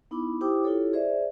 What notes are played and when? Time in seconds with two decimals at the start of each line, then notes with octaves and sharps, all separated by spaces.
0.11 B3 D#4 E4 B5 D6
0.41 E4 G4 C5 G5 D6 D#6
0.64 E4 F4 G4 A4 C#5
0.93 G#4 C5 D5 E5